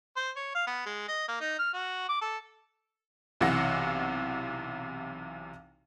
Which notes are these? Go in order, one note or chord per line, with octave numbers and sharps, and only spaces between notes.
C5
C#5
F5
B3
G#3
D#5
A#3
D#4
F6
F#4
D6
A4
B1 C3 E3 F5 F#5 A#6